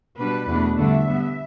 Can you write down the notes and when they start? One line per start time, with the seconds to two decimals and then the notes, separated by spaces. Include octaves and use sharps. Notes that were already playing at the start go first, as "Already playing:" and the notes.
0.18 B2 G3 D4 B4
0.47 E2 B2 A3 D4
0.77 G2 D3 A3 D4 E5
1.06 G2 G3 B3